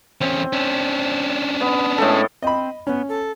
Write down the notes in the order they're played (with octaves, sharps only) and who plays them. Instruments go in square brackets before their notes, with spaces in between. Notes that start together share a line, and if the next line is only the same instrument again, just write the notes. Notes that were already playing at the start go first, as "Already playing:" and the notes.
[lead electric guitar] E2 C#4 [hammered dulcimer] C4
[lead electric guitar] C#4 D4
[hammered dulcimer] B3
A2 G#3 A4
[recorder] C4 [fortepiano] D#5 B5
[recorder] B3 [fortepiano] C#4
[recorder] A4